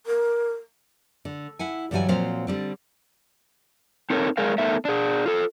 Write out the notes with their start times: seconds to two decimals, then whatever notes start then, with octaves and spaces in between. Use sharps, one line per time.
0.07 A#4
1.25 D3
1.59 E4 F#5 G#5
1.91 G2 D3 E3 F#3 G3 G#5
2.08 A#2 F3 F#3 C4 C5 F5
2.47 D3 G3 C4
4.10 C4 D#4 A4 A#4 C5 C#5
4.37 G#3 G#4 A#4 D5 F5
4.58 A3 B3 D#4 A4 A#4 E5
4.85 D4 G#4
5.26 F4 A4